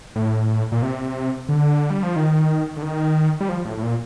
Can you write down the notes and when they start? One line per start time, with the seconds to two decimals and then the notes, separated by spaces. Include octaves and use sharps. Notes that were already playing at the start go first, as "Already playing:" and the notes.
0.16 A2
0.72 A#2
0.83 C3
1.49 D3
1.90 G3
2.03 F3
2.16 D#3
2.77 D3
2.82 D#3
3.40 G3
3.49 F3
3.65 A2
3.78 A2
3.83 A#2